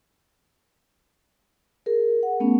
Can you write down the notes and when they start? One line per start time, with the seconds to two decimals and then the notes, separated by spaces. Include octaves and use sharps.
1.86 G#4 A#4
2.23 F#5
2.40 A3 B3 C#4